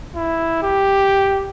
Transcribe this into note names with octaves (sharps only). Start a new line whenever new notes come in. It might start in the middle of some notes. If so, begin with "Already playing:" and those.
E4
G4